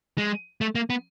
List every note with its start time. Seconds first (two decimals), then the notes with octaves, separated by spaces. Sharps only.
0.18 G#3
0.61 A3
0.75 A#3
0.90 B3